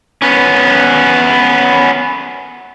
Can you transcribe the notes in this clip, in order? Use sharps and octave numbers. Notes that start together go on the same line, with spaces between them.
B3 C#4